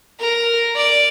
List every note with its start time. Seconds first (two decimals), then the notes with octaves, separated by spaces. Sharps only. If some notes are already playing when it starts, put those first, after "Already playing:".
0.20 A#4
0.76 D5